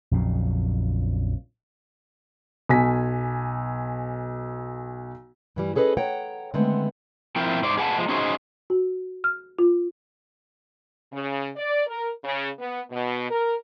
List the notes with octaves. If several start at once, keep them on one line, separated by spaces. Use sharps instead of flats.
A#1 F2 C#3 F#3
B1 G#5 B6
G2 E3 G3
C#4 G#4 A4 B4 C5 D#5
C#5 F#5 G5 A#5
D3 D#3 G#3 A3 B3 C4
F3 C4 E4 A#4 G5
G#2 C5 D5
G#4 B4 F#5 G5 A5
F3 G#3
C#4 D#4 F#4 G#4 C5 D#5
F#4
F6
F4
C#3
D5
A#4
C#3
B3
B2
A#4